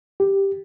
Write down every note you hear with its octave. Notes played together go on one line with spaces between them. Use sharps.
G4